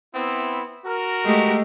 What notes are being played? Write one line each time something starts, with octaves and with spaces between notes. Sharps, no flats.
B3 C4 E4
F#4 A#4
G#3 A3 G4